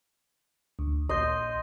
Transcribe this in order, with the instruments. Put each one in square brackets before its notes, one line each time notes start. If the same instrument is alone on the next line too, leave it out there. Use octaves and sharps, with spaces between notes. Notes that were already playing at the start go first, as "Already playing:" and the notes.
[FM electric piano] D2
[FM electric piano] A#1 C6 G6 [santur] D#5